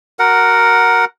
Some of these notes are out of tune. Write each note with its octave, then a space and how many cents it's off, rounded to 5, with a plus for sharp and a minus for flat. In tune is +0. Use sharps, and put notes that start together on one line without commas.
F#4 +0 A#4 +0 F#5 +0